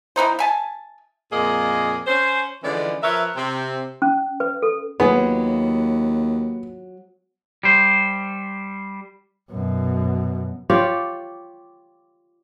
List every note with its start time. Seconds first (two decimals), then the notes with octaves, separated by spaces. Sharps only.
0.16 E3 B3 D#4 C5
0.39 E5 G#5 A5
1.32 F2 A#2 A#3 F4 G#4 D#5
2.07 C#4 C5
2.63 D3 E3 F3 G#3 C#4 D5
3.03 F3 A#4 B4 C#5 E5
3.36 C3 C4
4.02 C#4
4.40 B4
4.62 A4
5.00 D#2 F#3 B3 F4 G#4
7.64 G3 C5
9.50 F#2 B2
10.70 F4 G4 C#5 D5